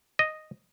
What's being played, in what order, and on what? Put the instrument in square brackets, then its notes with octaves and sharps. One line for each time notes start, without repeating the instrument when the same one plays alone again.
[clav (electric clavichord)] D#5